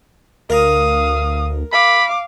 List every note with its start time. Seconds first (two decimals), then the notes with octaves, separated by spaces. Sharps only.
0.50 D2 A#4 F5 A#5 D#6
1.73 F5 B5 D6